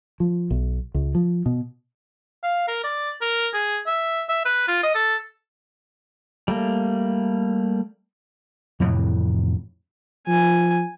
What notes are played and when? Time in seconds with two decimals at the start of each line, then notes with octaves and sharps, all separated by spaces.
0.20 F3
0.51 B1
0.94 C#2
1.15 F3
1.46 B2
2.44 F5
2.68 A#4
2.84 D5
3.22 A#4
3.54 G#4
3.87 E5
4.29 E5
4.45 B4
4.68 F4
4.83 D#5
4.95 A4
6.48 G3 A3 A#3
8.80 F2 A2 C3 E3
10.27 F3 G#5